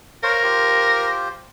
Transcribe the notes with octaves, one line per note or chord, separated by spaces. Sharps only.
A#4 C5 C#5 F5
F4 G4 C5